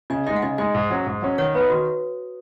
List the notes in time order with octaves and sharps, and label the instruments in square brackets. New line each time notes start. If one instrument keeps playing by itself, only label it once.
[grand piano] C#3 [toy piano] D#5 G#5
[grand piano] G#3 D#4 [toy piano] D#5 G#5
[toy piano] F#5
[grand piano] C#3 [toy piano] D#5 G#5
[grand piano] G#3 D#4 [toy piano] D#5 G#5
[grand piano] G#2
F#3 C#4
G#2
F#3 C#4
[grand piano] D#3 [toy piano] C#5 F#5
[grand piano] B3 D#4 [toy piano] B4
[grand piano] D#3 [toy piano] F#4